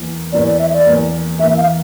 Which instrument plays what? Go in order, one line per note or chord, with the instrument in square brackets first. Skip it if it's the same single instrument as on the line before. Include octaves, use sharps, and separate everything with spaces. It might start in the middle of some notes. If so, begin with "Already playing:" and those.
Already playing: [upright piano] E2 E3 A#3
[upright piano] E2 E3 A#3 [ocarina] D5
[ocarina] D5
E5
D5
[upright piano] E2 E3 A#3
[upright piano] E2 E3 A#3 [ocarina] E5
[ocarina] F5